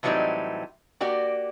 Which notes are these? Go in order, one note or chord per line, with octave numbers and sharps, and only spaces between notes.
A2 E3 F#3 G3 C4 D#4
A#3 F#4 G4 D5